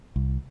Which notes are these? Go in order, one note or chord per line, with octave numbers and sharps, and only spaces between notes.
C2